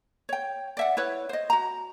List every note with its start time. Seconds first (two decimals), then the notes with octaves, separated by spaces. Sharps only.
0.29 C#5 G5
0.77 D5 E5 F#5
0.97 E4 B4 C#5
1.29 C5 D#5
1.50 F#4 A#5